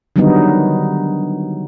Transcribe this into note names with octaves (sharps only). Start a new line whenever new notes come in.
D3 D#3 F#3 G3 B3 D#4